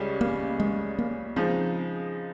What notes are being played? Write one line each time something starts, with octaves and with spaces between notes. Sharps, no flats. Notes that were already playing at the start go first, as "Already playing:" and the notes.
Already playing: C#2 C#3 G3 C#4
A#3
G#3
A#3
C#3 F3 G#3 C4 D#4